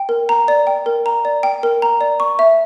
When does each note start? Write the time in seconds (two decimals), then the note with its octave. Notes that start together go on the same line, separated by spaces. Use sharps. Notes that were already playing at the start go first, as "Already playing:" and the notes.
Already playing: G5
0.09 A#4
0.29 A#5
0.48 D5
0.67 G5
0.86 A#4
1.06 A#5
1.25 D5
1.43 G5
1.63 A#4
1.82 A#5
2.01 D5
2.20 C#6
2.39 E5